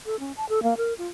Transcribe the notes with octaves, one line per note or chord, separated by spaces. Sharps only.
A4
C#4
A5
A4
A#3
A#4
F4